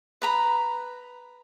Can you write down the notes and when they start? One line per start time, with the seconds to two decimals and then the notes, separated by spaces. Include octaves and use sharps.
0.22 B4 A#5 B5